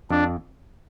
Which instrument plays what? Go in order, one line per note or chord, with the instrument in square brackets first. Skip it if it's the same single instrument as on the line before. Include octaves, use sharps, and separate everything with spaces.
[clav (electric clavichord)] F2 [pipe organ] D4